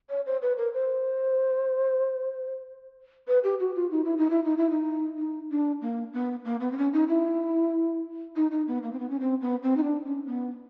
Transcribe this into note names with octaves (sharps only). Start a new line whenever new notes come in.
C#5
C5
B4
A#4
C5
B4
G4
F#4
F4
D#4
E4
D#4
E4
D#4
E4
D#4
D#4
D4
A#3
B3
A#3
B3
C4
C#4
D#4
E4
D#4
D#4
B3
A#3
C4
B3
C#4
C4
B3
C4
D#4
D4
C#4
B3